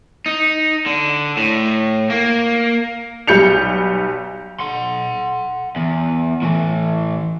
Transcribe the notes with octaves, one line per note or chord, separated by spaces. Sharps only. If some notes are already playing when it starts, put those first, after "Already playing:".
D#4
D3
A2
A#3
B1 G3 G6 C#7 F7
F#5 C6
E2
A2 E3